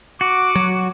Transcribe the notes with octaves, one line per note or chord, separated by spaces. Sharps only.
F#4 D6
F#3